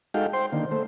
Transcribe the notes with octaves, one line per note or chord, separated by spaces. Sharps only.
G#3 D#4 F#4 A4 F5 G5
C5 G5 C6
D3 D#3 A#3
A3 C5